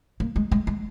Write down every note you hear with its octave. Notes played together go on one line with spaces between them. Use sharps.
A#3
G#3
G#3
G#3